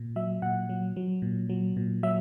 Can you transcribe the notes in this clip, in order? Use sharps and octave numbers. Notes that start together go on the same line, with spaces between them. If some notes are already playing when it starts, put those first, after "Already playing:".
Already playing: A#2
F#3 E5
A#2 F#5
F#3
F#3
A#2
F#3
A#2
F#3 E5